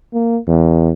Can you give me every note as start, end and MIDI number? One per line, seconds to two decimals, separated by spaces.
0.14 0.38 58
0.48 0.92 40